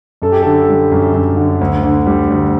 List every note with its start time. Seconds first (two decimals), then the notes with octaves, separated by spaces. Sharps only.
0.22 F#2 A4
0.32 G4
0.43 D3 A4
0.69 G3
0.91 F#2
1.14 F#2
1.37 D3
1.61 D2
1.83 D3
2.06 G3
2.30 D2